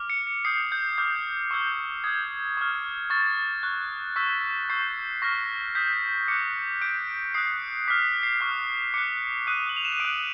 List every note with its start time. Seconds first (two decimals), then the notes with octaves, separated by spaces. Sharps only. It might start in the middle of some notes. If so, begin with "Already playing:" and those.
Already playing: D6 F6
0.10 C#7
0.27 C#7
0.45 D#6 G6 C7
0.72 G6
0.98 D6 F6 G6
1.51 C#6 E6 G6
2.04 D#6 G6 G#6
2.57 C#6 F6
3.10 C#6 F6 A6
3.63 C#6 F#6
4.16 C#6 E6 G6 B6
4.70 C#6 E6 G6 C7
5.22 C#6 F6 A#6
5.75 D#6 G6 B6
6.28 D6 F#6 C#7
6.81 D6 G6 D7
7.34 D#6 F#6 C7
7.88 D6 F6 B6
8.23 C7
8.41 C#6 F6
8.94 D6 F#6 C#7
9.47 D#6 F#6 D#7
9.69 F#7
9.76 F7
9.85 E7
9.92 D#7
10.00 D#6 F#6 D7